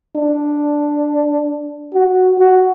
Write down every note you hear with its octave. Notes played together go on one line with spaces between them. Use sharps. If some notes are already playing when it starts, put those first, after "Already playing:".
D4
F#4
F#4